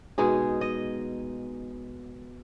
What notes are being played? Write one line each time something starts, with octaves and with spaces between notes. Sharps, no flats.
B2 G#3 D#4 G#4
D#5